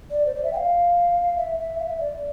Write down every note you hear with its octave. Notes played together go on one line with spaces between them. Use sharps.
D5
C5
D5
E5
G5
F5
E5
E5
F5
E5
D5